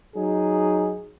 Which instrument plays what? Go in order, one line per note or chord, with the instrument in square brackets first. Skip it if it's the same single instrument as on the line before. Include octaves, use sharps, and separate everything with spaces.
[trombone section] F#3 D#4 G#4